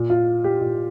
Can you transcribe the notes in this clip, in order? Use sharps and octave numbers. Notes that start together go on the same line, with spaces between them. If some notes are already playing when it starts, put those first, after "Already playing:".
Already playing: A#2
F4
G4
A#2